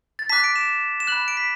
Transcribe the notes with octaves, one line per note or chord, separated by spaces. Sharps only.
A6
A5 D6 F#6 B6
D7
E7
E7
B5 F#6 F#7
D7
B6